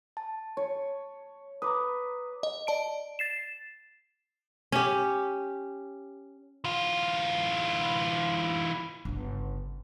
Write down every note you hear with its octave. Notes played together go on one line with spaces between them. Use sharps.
A5
C#5
B4 A#5 D6 D#6
D#5
D5 A5 D7
A6 C7 E7
C#4 G4
E3 F4
G1 C#3